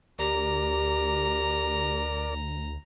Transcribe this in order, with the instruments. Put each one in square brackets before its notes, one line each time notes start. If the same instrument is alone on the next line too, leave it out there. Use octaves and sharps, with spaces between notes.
[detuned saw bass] D2 [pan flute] G4 [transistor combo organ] A#4 D5 [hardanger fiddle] A#5